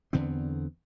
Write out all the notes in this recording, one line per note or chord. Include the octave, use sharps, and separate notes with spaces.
E2 D3 B3 C4